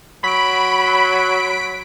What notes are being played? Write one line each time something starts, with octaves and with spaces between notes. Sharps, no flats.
F#3 B5 B6 D7